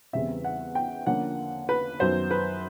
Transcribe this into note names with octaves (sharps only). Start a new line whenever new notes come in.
E2 C#3 E3 G3 C4 E5
F#5
G5
D3 F3 A#3 C#4 F#5
B4
F#2 D#3 F#3 B3 C5
B4